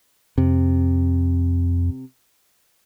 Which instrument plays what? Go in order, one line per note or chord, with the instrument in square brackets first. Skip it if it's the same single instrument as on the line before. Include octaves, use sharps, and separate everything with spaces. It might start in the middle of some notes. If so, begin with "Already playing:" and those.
[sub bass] F2 [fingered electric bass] C3